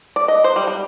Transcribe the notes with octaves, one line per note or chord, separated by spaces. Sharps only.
D5
D#5
C5
G3
G3